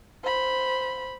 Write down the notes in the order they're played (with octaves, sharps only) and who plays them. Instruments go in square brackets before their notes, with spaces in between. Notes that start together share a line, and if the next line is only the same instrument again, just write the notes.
[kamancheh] C5 B5